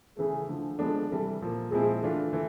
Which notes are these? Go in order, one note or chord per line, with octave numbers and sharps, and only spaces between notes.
C#3 E3 A3 G#4
D3 F3 A3
D3 F3 G#3 B3 D4 A4
C3 E3 G3 A4
A#2 F3 A#3
A#2 F3 G#3 C4 E4 G#4
E3 A3 D4 F4
E3 A3